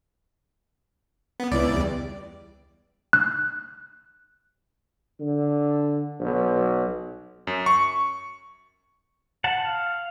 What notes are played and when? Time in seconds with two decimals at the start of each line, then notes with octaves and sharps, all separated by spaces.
1.40 B3
1.51 C#2 B3 E4 B4 D5
1.72 E2 G3
3.13 F#6
5.20 D3
6.20 B1
7.47 F#2
7.66 C#6
9.44 F#5 A5
9.65 F5